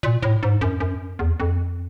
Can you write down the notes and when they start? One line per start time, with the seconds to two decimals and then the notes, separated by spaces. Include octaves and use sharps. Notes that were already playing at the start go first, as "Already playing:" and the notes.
0.03 A#2
0.23 A2
0.43 G#2
0.61 F#2
0.80 F#2
1.19 E2
1.40 F2